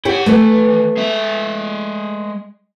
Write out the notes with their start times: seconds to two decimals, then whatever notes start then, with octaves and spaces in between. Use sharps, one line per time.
0.05 E4 G4 C#5 F#5 G5
0.26 E3 A3 B3 B4
0.97 G#3 E5